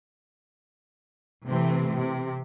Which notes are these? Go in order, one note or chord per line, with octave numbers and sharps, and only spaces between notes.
C3 E3 A3 C4
C3